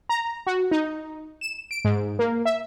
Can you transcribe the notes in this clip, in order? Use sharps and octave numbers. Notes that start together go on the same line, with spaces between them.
A#5
F#4
D#4
E7
D7
G#2
A#3
E5